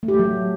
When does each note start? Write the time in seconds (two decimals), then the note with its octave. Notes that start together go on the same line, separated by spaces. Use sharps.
0.03 A3
0.08 G4
0.14 A3
0.19 F#3
0.25 A3